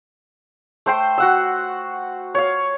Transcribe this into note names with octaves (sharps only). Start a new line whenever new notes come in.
A3 C5 G5 C6
F#4 F#5 E6
C#5 F5